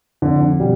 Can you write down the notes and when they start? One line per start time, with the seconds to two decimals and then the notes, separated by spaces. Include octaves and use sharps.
0.22 F2 D3
0.60 B2 G3